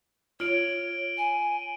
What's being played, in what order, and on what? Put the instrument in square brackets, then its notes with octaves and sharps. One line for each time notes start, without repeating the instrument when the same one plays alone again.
[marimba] F4 [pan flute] C#5 [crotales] D7 F#7 G7
[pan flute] G#5